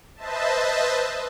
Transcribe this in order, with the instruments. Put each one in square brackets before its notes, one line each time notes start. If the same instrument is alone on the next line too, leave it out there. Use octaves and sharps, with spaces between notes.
[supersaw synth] B4 C5 D#5 E5 A5